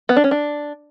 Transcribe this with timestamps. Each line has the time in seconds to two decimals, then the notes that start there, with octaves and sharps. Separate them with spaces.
0.09 B3
0.16 D4
0.24 C#4
0.31 D4